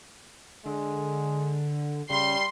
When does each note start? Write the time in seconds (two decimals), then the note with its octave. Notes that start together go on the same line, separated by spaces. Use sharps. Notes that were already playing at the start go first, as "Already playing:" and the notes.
0.66 D3 G#3
2.10 C#3 G3 C6